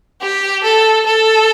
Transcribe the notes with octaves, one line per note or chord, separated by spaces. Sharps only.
G4
A4
A4